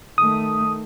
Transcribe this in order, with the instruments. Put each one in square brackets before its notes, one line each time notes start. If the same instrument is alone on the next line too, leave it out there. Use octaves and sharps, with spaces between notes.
[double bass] D#3 A3 [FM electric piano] D#6